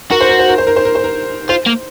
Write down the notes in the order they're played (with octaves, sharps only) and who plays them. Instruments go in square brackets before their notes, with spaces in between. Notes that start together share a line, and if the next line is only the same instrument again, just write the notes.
[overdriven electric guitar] F#4 [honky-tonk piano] A#4
[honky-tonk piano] C5
A#4
C5
A#4
C5
A#4
C5
A#4
C5
A#4
[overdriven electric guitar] F4 [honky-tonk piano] C5
[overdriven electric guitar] A#3